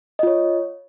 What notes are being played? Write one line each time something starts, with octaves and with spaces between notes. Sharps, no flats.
F4 C#5 D#5